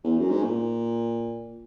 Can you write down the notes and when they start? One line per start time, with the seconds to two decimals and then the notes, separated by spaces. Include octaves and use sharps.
0.04 E2
0.18 F#2
0.30 G#2
0.43 A#2